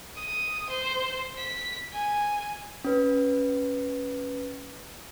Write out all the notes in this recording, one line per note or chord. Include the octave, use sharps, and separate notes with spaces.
D#6
C5
B6
G#5
C#4 B4